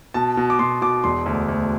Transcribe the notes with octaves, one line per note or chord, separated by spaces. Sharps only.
B2 A5
B2
D6
B2 C6
B2 D6
E1 C6
D2
D2